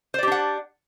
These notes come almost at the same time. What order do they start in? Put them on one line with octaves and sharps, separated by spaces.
C5 D5 G4 D4 F#5